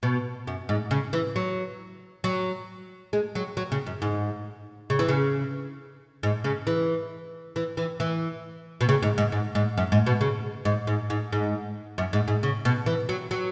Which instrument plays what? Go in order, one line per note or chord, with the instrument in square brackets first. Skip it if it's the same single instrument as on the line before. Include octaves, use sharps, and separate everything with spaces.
[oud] B2
F#2
G#2
C#3
E3
F#3
F#3
G#3
F#3
F#3
C#3
F#2
G#2
C#3
E3
C#3
G#2
C#3
E3
E3
E3
E3
B2
C#3
G#2
G#2
G#2
G#2
F#2
G#2
B2
C#3
G#2
G#2
G#2
G#2
F#2
G#2
G#2
C#3
B2
E3
F#3
F#3